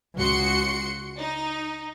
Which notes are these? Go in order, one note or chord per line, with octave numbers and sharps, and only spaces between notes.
C#2 F#4 C6 C#7
D#4